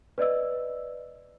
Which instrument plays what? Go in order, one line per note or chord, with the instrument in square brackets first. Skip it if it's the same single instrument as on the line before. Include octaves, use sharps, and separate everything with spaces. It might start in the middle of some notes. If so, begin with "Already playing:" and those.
[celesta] B4 D5 D#5 E6